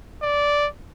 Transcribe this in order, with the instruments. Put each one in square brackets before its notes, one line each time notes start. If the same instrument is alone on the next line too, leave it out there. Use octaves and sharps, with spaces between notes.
[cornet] D5